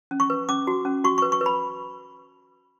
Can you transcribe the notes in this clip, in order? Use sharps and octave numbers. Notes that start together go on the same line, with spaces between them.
C#4
C#6
B4
C#4 D6
F#4
C#4
F#4 C#6
C#6
B4
C#6
B4
B5